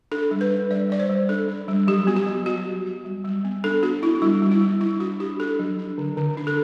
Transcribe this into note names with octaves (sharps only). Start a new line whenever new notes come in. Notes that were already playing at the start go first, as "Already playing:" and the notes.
D4 A4
G3
B4
D4
G3 D5
G3 D5
C5
G3
D4 A4
D4
G3
F#3 G4
B3 F#4
G4
F#3
F#3 F#4
F#3
F#3
G3
G3
B3
D4 A4
B3 F#4
D4 E4
G3 E4
G3
E4
G3
D4 E4
D4 F#4
D4 G4
D4 A4
F#3
D4
D3
D3
D4
A4